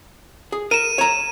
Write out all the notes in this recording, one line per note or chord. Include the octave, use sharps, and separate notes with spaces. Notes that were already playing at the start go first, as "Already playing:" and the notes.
G#4
A#4 D#7 E7
C#5 A#5